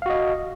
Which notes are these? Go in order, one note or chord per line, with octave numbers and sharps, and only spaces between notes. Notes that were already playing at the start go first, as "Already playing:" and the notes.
F#4 D#5 F5